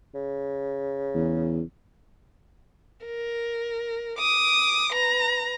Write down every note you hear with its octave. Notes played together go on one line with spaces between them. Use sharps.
C#3
E2
A#4
D6 D#6
B4 A#5